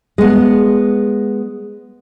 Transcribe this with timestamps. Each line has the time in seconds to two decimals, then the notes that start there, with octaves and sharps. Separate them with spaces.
0.18 G#3 B3